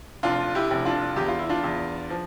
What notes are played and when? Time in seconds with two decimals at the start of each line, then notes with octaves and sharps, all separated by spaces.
0.23 F1 D4 F4
0.55 E4 G4
0.71 F1
0.85 D4 F4
1.16 E2 G4
1.28 F4
1.38 E4
1.49 D4 F4
1.64 E2
2.10 F3